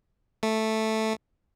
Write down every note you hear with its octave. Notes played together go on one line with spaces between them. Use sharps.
A3